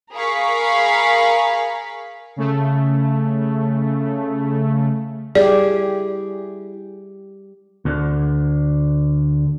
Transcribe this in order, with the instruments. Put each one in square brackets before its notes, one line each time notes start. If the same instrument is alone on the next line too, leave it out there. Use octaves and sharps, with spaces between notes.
[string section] G#4 A#4 F5 B5 C#6
[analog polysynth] C#3 A3
[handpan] G3 G4 [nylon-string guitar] E4 G#4 [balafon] D5
[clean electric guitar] D2 D3